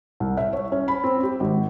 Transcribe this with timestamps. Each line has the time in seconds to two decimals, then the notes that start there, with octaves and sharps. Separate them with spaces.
0.20 C2
0.37 E5
0.53 C#5
0.72 C#4
0.88 B5
1.04 C4
1.23 G4
1.40 G#1